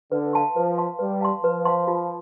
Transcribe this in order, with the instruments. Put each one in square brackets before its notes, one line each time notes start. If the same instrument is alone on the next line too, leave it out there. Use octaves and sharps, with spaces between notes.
[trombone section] D3 [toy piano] B4
[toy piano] F5 A5 C6
[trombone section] F3 [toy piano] B4
[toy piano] F5 A5 C6
[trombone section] G3 [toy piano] B4
[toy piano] F5 A5 C6
[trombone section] F3 [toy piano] B4
[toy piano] F5 A5 C6
F4